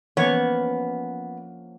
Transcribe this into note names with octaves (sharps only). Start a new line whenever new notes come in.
F3 A#3 B3 C#4 C#5